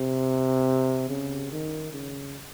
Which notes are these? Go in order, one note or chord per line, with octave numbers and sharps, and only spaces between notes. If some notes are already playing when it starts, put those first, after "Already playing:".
Already playing: C3
C#3
D#3
C#3